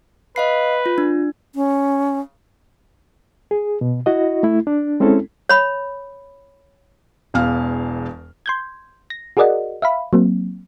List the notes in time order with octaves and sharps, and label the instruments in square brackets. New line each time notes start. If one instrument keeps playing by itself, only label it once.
[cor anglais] B4 [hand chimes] D#5 F5 C7
[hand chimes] F4
D4
[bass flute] C#4
[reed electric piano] G#4
B2
E4 F#4 D#5
A3 E4
D4
G#3 C4 C#4 E4 A4
[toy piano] C#5 B5
[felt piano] E1 E2 F5 F6
[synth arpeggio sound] C6 G6 G#6
A#6
F#4 G#4 A#4 D5 D#5 F#5
E5 F5 B5
F#3 A#3 C4